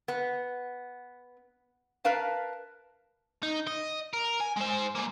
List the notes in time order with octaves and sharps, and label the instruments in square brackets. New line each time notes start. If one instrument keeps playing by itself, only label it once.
[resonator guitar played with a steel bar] B3
A#4 B4 F5 A5
[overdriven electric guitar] D#4
D#5
A#4
G#5
G#3 C5
G#3 A#3